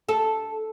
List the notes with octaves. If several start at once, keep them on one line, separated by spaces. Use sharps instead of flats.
A4